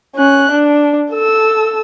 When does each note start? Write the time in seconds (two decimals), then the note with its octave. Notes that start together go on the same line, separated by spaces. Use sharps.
0.16 C#4 F#6
0.51 D4
1.12 A4 E6